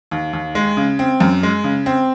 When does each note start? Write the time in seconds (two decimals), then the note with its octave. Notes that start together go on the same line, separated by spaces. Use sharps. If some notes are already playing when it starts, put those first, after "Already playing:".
0.11 D#2
0.33 D#2
0.55 G#3
0.77 C#3
0.99 C4
1.20 F#2
1.43 G#3
1.64 C#3
1.86 C4